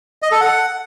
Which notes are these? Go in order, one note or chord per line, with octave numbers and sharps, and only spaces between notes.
D#5
A4
F#5